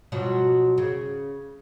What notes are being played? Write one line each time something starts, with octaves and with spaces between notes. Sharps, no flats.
B2 F3 F#3
C#3